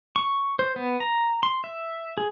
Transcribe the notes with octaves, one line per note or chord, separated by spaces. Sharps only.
C#6
C5
B3
A#5
C6
E5
G#4